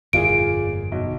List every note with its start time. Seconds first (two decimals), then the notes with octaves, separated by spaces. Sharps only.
0.13 G1 F2 A#2 F4 G#4 D7
0.92 B1